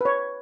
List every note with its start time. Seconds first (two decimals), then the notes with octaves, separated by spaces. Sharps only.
0.01 B4
0.05 C#5